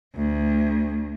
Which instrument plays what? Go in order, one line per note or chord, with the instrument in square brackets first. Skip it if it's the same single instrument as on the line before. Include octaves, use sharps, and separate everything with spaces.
[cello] D2